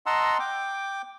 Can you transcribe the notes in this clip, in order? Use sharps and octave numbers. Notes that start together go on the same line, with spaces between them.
D#5 F#5 A5 A#5 C6 E6
G5 D6